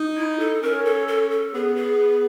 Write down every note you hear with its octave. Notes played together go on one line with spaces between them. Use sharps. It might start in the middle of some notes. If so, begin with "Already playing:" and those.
Already playing: D#4
E4
A4
C#4 A#4
A4
A4
A4
B3 G#4
G#4